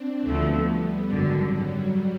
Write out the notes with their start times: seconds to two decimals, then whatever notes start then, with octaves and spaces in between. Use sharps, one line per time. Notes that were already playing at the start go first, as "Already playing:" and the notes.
Already playing: C4 D4
0.27 D2 D3 F3 A3 B3
0.68 G3
1.08 G#1 F#2 D3 G3
1.49 F#3